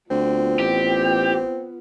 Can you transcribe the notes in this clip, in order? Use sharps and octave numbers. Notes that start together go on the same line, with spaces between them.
D2 B3 C4 F4
A1 G4